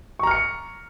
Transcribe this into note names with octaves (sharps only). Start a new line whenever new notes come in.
A#5 C#6 F6 C#7